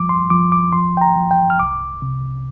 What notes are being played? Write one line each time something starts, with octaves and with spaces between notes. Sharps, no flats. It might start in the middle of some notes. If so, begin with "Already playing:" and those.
Already playing: F3 G3 D6
C6
F3 D6
D6
F3 C6
G5
A#5
F3
G5
F6
C2 D6
C3